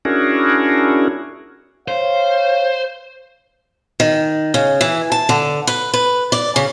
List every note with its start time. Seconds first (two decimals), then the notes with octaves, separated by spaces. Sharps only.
0.05 C#4 D4 E4 F#4 G#4 A#4
1.88 C5 C#5 F5
4.00 D#3
4.54 C#3
4.81 E3
5.12 A5
5.29 D3
5.67 B4
5.94 B4
6.32 D5
6.56 C#3